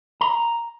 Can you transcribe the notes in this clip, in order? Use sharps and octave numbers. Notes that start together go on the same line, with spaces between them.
A#5